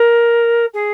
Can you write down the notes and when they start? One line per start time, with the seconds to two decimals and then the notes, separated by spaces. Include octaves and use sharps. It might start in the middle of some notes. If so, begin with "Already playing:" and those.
Already playing: A#4
0.73 G#4